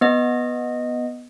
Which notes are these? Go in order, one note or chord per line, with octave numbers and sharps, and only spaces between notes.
B3 D#5